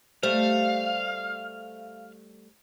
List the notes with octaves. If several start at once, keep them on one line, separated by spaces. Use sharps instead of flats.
G3 A3 C5 F5